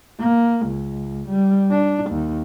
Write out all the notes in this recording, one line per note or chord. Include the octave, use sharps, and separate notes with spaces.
A#3
C#2
G3
D4
D#2